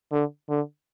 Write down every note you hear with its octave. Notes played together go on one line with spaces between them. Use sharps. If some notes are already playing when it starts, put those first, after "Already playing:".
D3
D3